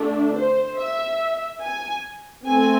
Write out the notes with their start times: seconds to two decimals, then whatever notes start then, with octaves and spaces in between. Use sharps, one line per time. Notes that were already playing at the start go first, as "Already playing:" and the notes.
Already playing: D3 A3 D4
0.35 C5
0.77 E5
1.63 G#5
2.47 A3 C4 G#5